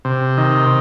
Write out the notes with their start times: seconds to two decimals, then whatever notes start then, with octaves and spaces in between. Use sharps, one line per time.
0.05 C3
0.38 D#3